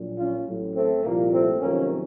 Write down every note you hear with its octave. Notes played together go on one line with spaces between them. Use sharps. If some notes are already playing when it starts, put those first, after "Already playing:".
Already playing: A#1 A#2 F#3
C#4 F4
A1 A2 F#3
A3 C4
C2 A#2 F3 A#3
A3 C4
F2 C3 D#3 F#3 A#3 C#4